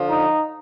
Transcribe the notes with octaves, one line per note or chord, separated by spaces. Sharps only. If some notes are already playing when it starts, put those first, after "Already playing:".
Already playing: D3 F3
D#4